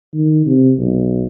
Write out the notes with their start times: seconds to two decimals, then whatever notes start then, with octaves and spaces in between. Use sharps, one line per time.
0.14 D#3
0.46 C3
0.78 B1